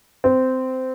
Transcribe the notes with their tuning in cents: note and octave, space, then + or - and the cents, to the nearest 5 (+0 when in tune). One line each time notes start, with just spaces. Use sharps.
C4 -15